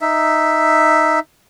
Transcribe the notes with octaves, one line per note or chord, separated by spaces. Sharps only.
D#4 E5